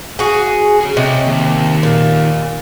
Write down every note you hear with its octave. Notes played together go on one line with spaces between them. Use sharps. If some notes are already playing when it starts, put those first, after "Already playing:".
F#4 G#4
G#4 C#5
C3 C#5 D#5
D#2
A#2